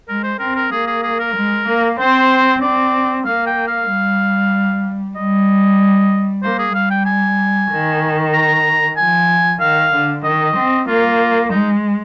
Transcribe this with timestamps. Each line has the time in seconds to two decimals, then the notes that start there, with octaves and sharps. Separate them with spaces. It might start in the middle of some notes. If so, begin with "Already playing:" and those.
0.08 G#3 A#4
0.23 C5
0.39 C4 A#4
0.56 A#4
0.71 A#3 G#4
0.87 G#4
1.02 G#4
1.19 A#4
1.35 G#3
1.67 A#3
1.98 C4 C5
2.61 C4 D5
3.25 A#3 F5
3.46 G5
3.68 F5
3.89 G3
5.16 G3 D#5
6.43 A#3 C5
6.59 G#4
6.74 G3 F5
6.90 G5
7.06 G#5
7.70 D#3
8.33 A#5
8.97 F3 G#5
9.60 D#3 F5
9.92 D3
10.24 D#3 D#5
10.55 C4
10.87 A#3 F4
11.50 G#3 D#4